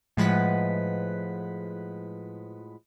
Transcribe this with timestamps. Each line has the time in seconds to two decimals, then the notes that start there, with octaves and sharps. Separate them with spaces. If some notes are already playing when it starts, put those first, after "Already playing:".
0.17 A2 F3 G#3 B4 F#5 B6